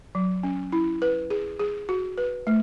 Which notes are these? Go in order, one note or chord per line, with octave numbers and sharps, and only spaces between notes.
F#3
C#4
E4
B4
G#4
G#4
F#4
B4
A3